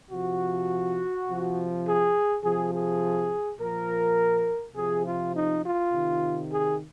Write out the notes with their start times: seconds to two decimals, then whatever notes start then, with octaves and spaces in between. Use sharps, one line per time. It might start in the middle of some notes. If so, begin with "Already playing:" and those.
0.10 C3 F3 F#4
1.26 C3 F3
1.85 G#4
2.42 C3 F3 G#4
2.72 G#4
3.58 A#2 F3 A#4
4.75 C3 F3 G#4
5.04 F4
5.33 D#4
5.63 F4
5.92 C3 D#3
6.50 G#4